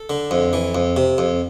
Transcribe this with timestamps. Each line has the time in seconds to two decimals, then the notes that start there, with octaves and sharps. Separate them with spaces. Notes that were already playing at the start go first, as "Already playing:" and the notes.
Already playing: A4
0.10 D3
0.31 F2
0.53 E3
0.75 F2
0.97 C3
1.18 F2